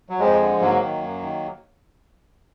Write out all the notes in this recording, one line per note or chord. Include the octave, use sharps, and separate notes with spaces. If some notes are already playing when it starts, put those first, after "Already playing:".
F#3
F2 F3 G#3
D3
G#2 F#3 A#3
D#3
F#2
D#3